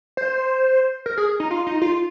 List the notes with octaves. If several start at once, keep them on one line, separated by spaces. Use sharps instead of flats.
C5
A#4
G#4
D#4
F4
D#4
F4